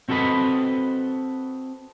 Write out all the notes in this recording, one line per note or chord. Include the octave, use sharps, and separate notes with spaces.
C4 F#4 A4 B4 D#5 B5